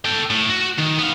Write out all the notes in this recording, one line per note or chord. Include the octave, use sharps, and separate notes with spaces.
A4 G5
A2
F#4
D#3
B3 F5